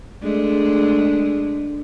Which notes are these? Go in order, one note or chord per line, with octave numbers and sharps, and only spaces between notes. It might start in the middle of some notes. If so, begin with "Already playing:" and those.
G#3 A3 D4